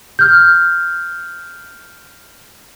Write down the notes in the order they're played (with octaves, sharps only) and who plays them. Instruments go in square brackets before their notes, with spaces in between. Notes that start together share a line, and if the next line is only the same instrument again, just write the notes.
[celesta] F6 G6